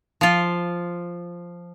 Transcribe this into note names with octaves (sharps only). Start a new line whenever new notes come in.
F3 F4